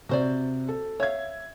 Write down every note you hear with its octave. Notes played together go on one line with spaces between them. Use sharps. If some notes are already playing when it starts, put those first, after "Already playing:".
C3 F#4 C5 D5
A4
C#5 E5 F5 G#6